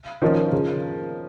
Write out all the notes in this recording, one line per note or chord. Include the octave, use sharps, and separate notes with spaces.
D#3 F3 C#4 F4 A#4 D#5
C#3